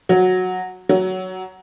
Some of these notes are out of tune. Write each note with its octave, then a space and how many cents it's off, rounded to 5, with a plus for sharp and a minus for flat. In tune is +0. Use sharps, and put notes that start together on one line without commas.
F#3 -10
F#3 +10